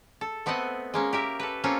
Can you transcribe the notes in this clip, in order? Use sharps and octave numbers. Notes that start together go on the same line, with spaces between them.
A4
A3 B3 C4 D#5 F#5
G#3 A#3 C#4
G4 A#4 E5
A4 B4
A#3 C4 C#4 F4 A4